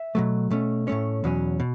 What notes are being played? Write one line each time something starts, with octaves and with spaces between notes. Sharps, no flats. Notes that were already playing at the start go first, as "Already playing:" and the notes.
Already playing: E5
B2 F#3 A3
B2 A3 C#4
A2 A3 C#4 C#5
E2 B2 F#3 C#4
B2